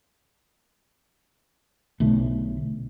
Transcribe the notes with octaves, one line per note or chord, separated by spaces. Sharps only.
B1 D3 A3